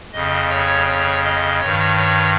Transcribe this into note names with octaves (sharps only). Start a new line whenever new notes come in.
F2 C#3 D#5
C#5
C#5
D#5
G2 D#3 C#5
C#5